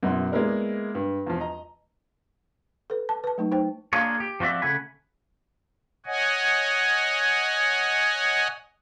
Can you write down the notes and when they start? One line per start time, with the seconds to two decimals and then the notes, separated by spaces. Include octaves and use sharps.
0.03 F#2 B2 F#3 E4 C6
0.32 G#3 A#3 B3 E4 A#4 D5
0.95 G2
1.27 E2 F3
1.40 D#5 A#5
2.90 A4 B4
3.09 A5
3.24 B4 A5
3.38 F#3 A3 D#4
3.52 D#4 C5 G5
3.93 A#3 D4 F4 G#4 C#5
4.20 G4
4.40 F3 C4 F#4 D5 E5
4.62 C#3 A3 F#5 G#5 B5
6.06 C#5 D#5 F#5 G#5